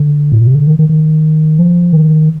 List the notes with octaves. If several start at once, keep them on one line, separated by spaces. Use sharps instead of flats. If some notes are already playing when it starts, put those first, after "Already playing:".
Already playing: D3
A2
A#2
C3
D3
D#3
D#3
D#3
F3
D#3